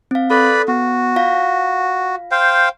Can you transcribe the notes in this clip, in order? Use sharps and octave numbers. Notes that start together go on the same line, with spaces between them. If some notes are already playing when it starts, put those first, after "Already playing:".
C4 F5
A4 B4 D5 B5
B3 F#4
F4 F5 A#6
C5 F5 G5